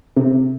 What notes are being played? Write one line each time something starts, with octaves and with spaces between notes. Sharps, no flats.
C3